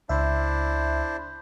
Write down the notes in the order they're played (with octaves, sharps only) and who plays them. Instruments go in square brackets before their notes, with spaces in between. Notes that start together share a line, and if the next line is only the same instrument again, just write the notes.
[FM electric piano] C#2 E5 [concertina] D4 E4 C5